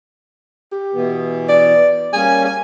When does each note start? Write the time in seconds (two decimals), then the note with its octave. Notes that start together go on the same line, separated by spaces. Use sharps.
0.72 G4
0.94 B2 E3 B3
1.49 D5
2.13 G3 A#3 C#4 G#5
2.45 G#5